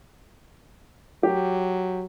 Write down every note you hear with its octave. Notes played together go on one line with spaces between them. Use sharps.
F#3 G4